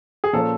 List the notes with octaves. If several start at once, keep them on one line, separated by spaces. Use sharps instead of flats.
G#4
A#2 F3 A#3 C#4 A4